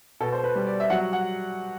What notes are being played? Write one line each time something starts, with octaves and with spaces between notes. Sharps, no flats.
B2 A4
C5
B4
G3
D5
E5
F#3 F#5
F#5